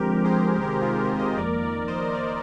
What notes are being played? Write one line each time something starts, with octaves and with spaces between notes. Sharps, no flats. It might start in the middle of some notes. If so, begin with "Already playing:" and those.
Already playing: D3 F3 G#3 C4 G4 A#4
G#4 C5
C3 D#3 G#3 C4 G4 A#4
F4 G#4
G4 A#4
C5 D#5
F2 D#3 A#3 A#4 D5
A#4 D5
C5 D#5
A#4 D5